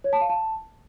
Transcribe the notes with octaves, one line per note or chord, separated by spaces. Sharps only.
C#5
A5
F5
A5